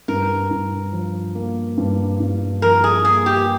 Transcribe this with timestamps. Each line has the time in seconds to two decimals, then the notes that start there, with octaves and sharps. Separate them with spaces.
0.08 G2 A#4
0.51 G2
0.93 F3
1.35 A#3
1.77 G2
2.20 G2
2.62 F3 A#4
2.84 G#4
3.05 A#3 G#4
3.26 G4